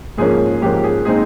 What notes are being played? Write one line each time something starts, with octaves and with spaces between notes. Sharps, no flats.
G#2 F3 A#3 C#4 G#4
G#2 F3 A#3 C#4 G4
G#4
A#2 G#3 C4 D#4 G#4